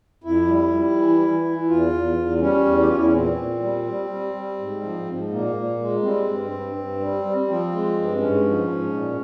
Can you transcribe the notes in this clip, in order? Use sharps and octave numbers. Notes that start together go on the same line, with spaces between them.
F2 E4
G3
G3
E3
E3
E3
E2 F4
E2
E2
G3 C#4
E2
G4
E2 F4
E4
C#4
A#2 C4
A#2
G3
G3
G3
G3
G#2
F3
G#2
A#2 A#3
A#2
G#3
G3 C4
G2
G2
G2
G3
G3
F3 C4
G#3
G2
G#2 C#4
F3
G#2
A#2